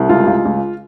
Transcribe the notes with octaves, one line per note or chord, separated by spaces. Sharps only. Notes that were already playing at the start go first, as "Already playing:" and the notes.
Already playing: C2
C#2 F4
C#2
C#2